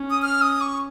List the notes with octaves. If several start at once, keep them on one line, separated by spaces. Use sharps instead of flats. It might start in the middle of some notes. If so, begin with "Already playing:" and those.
Already playing: C#4
D#6
F6
D#6
C#6